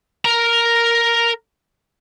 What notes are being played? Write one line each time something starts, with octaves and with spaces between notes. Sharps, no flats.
A#4 A#5